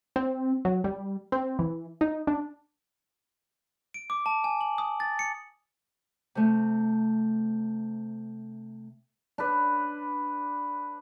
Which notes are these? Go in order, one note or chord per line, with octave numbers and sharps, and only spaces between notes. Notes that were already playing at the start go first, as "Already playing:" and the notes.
C4
F#3
G3
C4
E3
D#4
D4
D7
D6
A5
G#5
F#7
D#6
A6
C#7
C3 A3
D4 B4